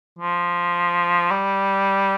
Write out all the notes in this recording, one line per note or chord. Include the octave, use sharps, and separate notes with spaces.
F3
G3